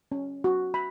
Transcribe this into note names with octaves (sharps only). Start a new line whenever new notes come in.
C#4
F#4
B5